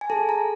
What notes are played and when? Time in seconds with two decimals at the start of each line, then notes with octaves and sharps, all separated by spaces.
0.01 G#5
0.10 G#4 A4 A5
0.29 A#5